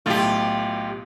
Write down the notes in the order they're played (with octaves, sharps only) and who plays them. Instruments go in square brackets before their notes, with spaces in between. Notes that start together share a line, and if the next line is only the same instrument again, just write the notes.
[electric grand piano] B1 A2 A3 [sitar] F4 G4